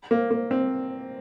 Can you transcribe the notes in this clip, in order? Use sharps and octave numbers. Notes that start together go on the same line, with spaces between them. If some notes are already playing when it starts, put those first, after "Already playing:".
A#3
A#3
C4